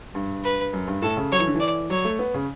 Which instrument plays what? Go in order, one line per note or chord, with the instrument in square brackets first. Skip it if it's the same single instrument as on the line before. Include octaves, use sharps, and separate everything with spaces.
[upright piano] G2
[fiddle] B4
[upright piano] F#2
G2
[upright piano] A2 [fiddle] A4
[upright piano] C#3
[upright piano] F#3 [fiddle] C#5
[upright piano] E3
D3
E3
[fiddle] D5
[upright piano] F#3 [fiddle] C#5
[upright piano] A3
B3
C#3